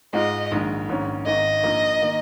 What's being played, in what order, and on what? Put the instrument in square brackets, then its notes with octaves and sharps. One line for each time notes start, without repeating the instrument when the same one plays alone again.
[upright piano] G#2 G#3 F4 [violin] D#5
[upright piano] A#1 G#2 D#3 G#3
A#1 G#2 D#3 C#4
[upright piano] G#1 G#2 D#3 [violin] D#5
[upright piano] A#1 A#2 A#3 D#4
D#3 A#3